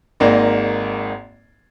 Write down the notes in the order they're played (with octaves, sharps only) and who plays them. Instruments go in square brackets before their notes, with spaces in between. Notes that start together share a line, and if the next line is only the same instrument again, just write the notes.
[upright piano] G#1 G#2 A#3 D5